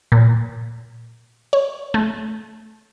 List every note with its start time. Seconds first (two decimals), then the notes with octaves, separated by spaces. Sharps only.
0.12 A#2
1.53 C#5
1.94 A3